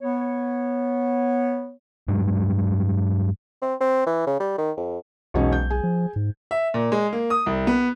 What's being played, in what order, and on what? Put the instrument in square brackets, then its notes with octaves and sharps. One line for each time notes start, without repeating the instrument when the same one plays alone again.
[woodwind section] B3 C#5
[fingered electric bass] G2 F#3 G#3
[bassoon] C4
C4
E3
C#3
G3
D#3
F2
[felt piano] E1 C#4 D#4 [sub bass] B1
[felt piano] G6
G#4 G#5
[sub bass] F3
G#2
[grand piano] E5
A#2
G#3
A#3
D#6
C2
B3